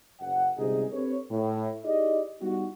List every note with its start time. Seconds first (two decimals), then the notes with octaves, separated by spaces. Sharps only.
0.21 F#1 F#5
0.58 G1 C#2 G2 C3 D#4 G#4
0.93 C4 D4 G4 A4 B4 C#5
1.31 A2
1.85 D#4 E4 G4 G#4 D5 D#5
2.41 G3 B3 D#4 E4 F#4